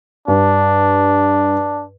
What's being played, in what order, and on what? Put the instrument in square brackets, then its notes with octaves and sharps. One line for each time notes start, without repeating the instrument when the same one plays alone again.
[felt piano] G2 [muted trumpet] D4